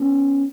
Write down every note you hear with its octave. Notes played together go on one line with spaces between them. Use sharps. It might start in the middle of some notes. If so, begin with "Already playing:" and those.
Already playing: B3 C#4